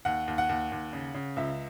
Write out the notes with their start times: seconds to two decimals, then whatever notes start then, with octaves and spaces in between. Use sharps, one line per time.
0.05 D#2 F#5
0.28 D#2
0.38 F#5
0.49 D#2
0.72 D#2
0.93 C#3
1.14 C#3
1.36 C#2 E5